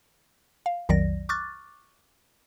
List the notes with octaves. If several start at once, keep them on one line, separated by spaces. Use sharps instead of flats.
F5
B1 F2 D#3 F#3 D5 A#6
C#6 D6 F6 F#6 A6